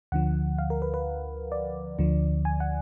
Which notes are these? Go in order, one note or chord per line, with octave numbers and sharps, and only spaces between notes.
D2 D3 F3 F#5
F5
A#4
B4
B4
D5
D2 D3 F3
G#5
F#5